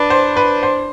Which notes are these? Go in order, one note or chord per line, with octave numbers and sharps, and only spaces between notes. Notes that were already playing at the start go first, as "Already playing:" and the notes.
Already playing: D4 B4
C5
B4
C5